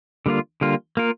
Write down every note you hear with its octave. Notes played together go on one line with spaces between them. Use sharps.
D3 G3 A#3 F4
D3 G3 A#3 F4
A#3 F4 A#4